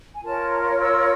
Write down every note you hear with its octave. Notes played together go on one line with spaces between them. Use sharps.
G#5
F4 A#4 C#5 A5
A#5
F6
E6